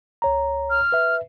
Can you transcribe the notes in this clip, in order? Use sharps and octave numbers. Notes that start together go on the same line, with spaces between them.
C#2 C#5 A#5
F6
B4 E5